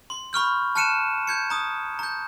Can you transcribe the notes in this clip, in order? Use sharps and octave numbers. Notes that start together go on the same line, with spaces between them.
C6
B5 C#6 F6 G6
A5 F6 F#6 C#7 D#7 E7
G6 G#6 C#7
A#5 D#6
A#5 G6